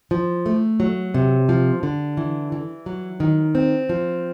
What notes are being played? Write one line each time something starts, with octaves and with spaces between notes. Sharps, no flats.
F3
A3
F#3
C3
F3
D3
E3
E3
F#3
D#3
C4
F3